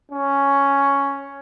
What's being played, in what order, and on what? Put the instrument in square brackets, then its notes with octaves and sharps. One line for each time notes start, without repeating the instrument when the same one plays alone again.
[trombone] C#4